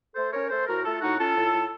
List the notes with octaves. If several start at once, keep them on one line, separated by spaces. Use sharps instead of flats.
A3 A4 C5
C#4 A#4 C#5
A3 A4 C5
A2 F#4 A#4
A3 F4 A4
A2 D#4 F#4
C#4 F4 A4
A2
A2